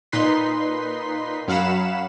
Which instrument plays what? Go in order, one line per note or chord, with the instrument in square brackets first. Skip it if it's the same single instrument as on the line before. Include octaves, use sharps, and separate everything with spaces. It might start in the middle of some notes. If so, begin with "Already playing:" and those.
[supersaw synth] A#2 D#4 B4 C6 B6
F#2 F#3 F5 F#5 B5 E7